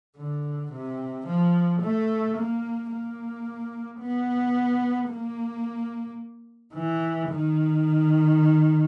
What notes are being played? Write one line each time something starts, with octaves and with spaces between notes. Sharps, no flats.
D3
C3
F3
A3
A#3
A#3
B3
A#3
E3
D#3